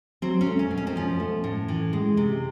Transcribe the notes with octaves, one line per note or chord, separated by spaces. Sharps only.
F#3 C4
C#4
A3
C#4
B2
C#4
C4
F3 C#4
A3
A2
E3
G#3
C3